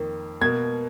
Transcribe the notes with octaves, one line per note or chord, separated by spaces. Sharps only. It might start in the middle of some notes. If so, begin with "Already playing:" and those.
Already playing: F2 D#3 A#3
B2 A#3 G#6